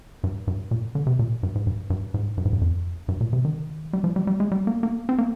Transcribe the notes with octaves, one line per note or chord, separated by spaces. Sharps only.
G2
G2
A#2
D3
C3
A#2
G2
G#2
G2
G2
G#2
G2
G#2
G2
F2
G2
A#2
C3
D#3
G3
F3
G3
G3
G#3
G3
A#3
A#3
C4
A#3